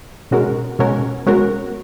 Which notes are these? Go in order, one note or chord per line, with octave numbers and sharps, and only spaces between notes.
B2 G#3 C#4 F#4 A#4
B2 G#3 C#4 F#4 A#4
B2 G#3 C#4 F#4 A#4